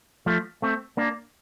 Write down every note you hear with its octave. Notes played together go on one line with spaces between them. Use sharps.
F3 A3
A3 C4
A#3 D4